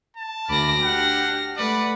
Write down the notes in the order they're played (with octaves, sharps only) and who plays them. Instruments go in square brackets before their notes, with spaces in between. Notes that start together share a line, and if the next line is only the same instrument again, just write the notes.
[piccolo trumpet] A5
[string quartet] D2 B5 D6 [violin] F6 A#6
[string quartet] D4 G4 [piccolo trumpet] F#5
[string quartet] A3 [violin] B4 F#5 [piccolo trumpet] D5